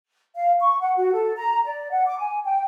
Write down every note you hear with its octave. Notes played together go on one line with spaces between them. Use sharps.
F5
C#6
F#5
F#4
A4
A#5
D5
F#5
D6
G#5
G5